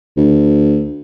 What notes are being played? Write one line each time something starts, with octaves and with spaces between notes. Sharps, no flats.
D2